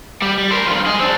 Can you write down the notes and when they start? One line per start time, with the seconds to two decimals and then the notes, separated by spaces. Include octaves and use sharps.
0.22 G3
0.38 G3
0.51 A#4 C5
0.67 G2 F4
0.87 G#4 D#5
1.00 C4 D4